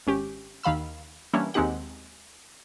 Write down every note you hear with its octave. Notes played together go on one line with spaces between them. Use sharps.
G#1 C#4 G4
D#2 D#3 F5 B5 E6
E3 G3 A#3 C#4 D4 E4
D#2 G#3 C4 D#4 G4 F#5